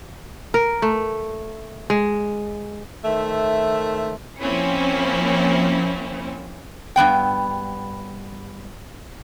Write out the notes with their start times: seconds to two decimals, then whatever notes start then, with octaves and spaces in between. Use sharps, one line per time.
0.54 A#4
0.82 A3
1.90 G#3
3.05 D#3 A3 C5 E5
4.40 F3 A#3 C4 C#4 E4
6.96 G2 E3 B3 G5